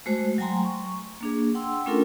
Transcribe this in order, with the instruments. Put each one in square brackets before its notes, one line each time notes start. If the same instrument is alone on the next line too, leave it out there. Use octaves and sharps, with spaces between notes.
[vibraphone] G#3 A3 F#4 C5
F#3 A3 G5 G#5 A#5 C6
C#6
A#3 D4 G#4
F#5 G5 C6 E6
A3 C#4 D4 F4 A4 A#4